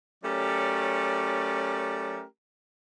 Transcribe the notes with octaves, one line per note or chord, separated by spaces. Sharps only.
F#3 A3 C#4 G4 A#4 D5